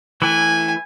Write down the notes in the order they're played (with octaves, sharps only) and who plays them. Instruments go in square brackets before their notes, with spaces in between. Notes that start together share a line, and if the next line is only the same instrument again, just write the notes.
[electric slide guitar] E3 A3 E4 [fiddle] G#5